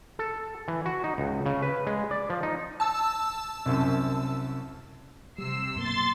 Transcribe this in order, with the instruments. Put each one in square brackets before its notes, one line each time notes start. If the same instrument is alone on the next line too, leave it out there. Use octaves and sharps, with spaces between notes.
[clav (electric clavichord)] A4
E3
F#4
D#4
C#2
C#3
B4
G#3
D5
F3
D#4
[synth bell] A5 E6
[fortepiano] C2 F#2
[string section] C3 E6 C7 [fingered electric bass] G3
[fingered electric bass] F#2 B2 A#3 [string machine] C6 A6